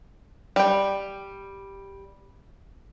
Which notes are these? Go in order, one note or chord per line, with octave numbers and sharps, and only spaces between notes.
G3 G5